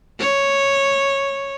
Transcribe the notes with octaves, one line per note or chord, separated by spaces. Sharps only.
C#5